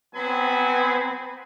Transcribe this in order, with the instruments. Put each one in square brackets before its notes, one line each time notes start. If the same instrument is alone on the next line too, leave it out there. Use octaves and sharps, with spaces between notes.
[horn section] F#3 B3 C4 C5 G#5 B5